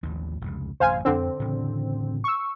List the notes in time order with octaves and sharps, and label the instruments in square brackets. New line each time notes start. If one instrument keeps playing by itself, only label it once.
[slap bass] A1 D#2 F3
F1 C#2
[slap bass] A1 F#2 C3 [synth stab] C5 F5 G#5
[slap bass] F2 D4 [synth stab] D3 C4
[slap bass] A2 C#3 E3
[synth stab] C#6 E6